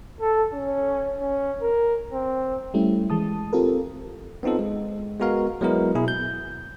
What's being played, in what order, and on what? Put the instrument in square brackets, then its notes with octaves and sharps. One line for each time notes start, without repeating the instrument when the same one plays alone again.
[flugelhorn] A4
C#4
C#4
A#4
C4
[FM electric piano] G3 A3 C#4 E4
E3 G#3 A5 D#6
C4 F4 G4 A4 A#4
[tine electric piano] B3 C4 D#4 F4 A4
G#3
G#3 B3 F#4 A#4 F5
F#3 G#3 B3 E4 A#4
B2 E4 G#4
G6